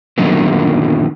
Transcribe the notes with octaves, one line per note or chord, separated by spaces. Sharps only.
F#2 A#2 D3 D#3 F#3 B3